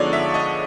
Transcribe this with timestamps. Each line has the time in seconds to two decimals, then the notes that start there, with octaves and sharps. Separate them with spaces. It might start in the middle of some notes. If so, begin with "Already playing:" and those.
Already playing: D3 F3 G#3 B3 D#4 C#5 D5
0.13 E5
0.34 D#5